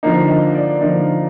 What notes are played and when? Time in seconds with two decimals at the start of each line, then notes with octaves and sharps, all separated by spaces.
0.03 D3 F3 A#3 D#4
0.29 D#5
0.55 D5
0.81 D3 F3 A#3 D#4